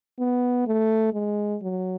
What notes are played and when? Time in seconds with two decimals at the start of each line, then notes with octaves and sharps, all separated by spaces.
0.19 B3
0.67 A3
1.13 G#3
1.62 F#3